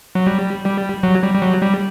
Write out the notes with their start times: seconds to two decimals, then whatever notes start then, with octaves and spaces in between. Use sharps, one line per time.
0.15 F#3
0.27 G3
0.66 G3
1.03 F#3
1.23 G3
1.34 G3
1.42 F#3
1.62 G3